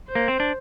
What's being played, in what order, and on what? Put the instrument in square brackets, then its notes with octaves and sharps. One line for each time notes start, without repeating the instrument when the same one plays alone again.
[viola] C5
[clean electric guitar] A#3
C4
D4